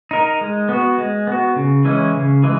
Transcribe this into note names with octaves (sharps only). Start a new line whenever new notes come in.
D#4 A#4
G#3
B3 F#4
G#3
B3 F#4
C#3
E3 G#3 C#4 E4
C#3
E3 G#3